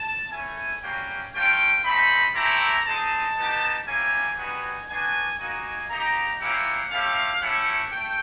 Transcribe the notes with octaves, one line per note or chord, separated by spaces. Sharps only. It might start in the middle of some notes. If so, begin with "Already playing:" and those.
Already playing: A5
A3 C#4 E4 G#5
G3 A#3 C#4 F#4 G5
A3 C#4 F4 G5
A3 C4 D#4 B5
A3 C4 E4 G4 A#5
G#3 C4 D#4 A5
B3 D#4 G4
A#3 C#4 E4 G4 G#5
G3 B3 D#4 F#4 G#5
B3 D4 F#4 G#5
A#3 D#4 F#4 G#5
A#3 D#4 G4 A#5
A#3 C#4 E4 G4 F#5
A3 C#4 E4 G4 F5
A3 C#4 E4 G4 F#5
A3 G5